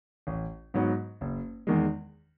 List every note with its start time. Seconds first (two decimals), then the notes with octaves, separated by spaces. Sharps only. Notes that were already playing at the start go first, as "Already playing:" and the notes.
0.27 A1
0.74 G#2 F#3 B3 F#4
1.21 F#1
1.67 E2 D#3 G#3